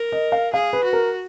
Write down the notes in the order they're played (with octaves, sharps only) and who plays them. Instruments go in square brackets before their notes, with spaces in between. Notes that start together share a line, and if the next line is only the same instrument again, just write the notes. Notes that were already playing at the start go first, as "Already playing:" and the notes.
Already playing: [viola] A#4
[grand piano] D#5
F5
[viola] G#4 [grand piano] F5
[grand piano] B4
[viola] F#4
[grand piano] A#4